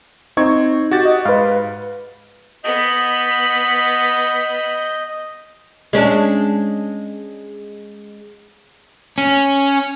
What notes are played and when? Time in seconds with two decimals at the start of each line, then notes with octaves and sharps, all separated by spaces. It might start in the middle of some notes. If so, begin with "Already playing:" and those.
0.37 C4 D#4 C#6 G#6
0.91 F#4 G4 A6
1.05 D#5
1.25 G#2 B4 F5
2.64 B3 D#5 B5 G6
5.93 G#3 C#4 D4
9.18 C#4